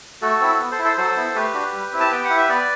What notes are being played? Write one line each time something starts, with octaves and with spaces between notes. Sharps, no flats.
A3 F#4 A4
C4 E4
B3
A4 C5
E4
A4 C5
F#3 A4 C5
B3 E4
A3 G4 B4
D4 F#4
G3
C4 E4
A5
B3 G5
F#5
E4
E5
B3 B4 D5